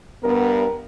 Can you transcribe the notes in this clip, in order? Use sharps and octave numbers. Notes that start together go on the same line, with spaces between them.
G2 B3 A#4